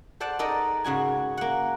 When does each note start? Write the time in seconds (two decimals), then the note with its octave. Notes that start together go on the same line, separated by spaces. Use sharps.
0.20 A4 C5 D5 F#5 A5
0.39 D#4 A4 A#4 D5 D#5
0.84 G#2 C#3 F#4 G#5
1.37 A#3 F#5